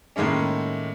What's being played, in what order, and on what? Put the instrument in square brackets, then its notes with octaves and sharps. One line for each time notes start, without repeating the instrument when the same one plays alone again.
[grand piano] A2 D#3 G#3 A#3 C#4